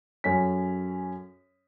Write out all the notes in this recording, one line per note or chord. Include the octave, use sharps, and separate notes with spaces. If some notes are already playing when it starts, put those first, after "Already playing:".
F#2 C#4 A4 B6